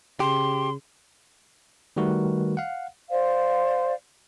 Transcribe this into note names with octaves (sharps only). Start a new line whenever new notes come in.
C#3 G4 C6
D#3 G3 A3 F#4 A#4 B4
F5 F#5
C5 D5 F5